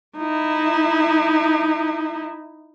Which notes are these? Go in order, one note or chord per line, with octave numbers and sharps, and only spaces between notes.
D#4 E4